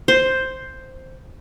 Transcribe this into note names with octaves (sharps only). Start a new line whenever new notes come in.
C5